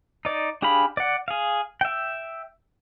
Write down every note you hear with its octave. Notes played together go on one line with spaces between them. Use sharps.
D#4 D5
D4 G4 G#4 F5 B5
D5 F#5
G#4 F5
E5 G5